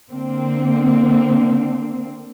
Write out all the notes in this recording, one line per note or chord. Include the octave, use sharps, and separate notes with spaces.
D3 A#3 C4